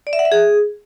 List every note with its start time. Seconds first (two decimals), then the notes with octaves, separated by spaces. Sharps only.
0.07 D5
0.13 E5
0.19 F#5
0.25 E5
0.32 G#4